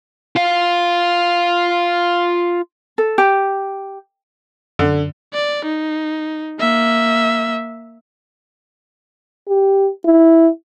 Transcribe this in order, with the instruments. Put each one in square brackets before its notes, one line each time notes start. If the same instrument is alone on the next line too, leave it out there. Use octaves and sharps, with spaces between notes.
[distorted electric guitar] F4 F5
[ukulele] A4
G4
[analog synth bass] F#2 [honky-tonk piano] D3
[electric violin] D5
D#4
A#3 E5
[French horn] G4
E4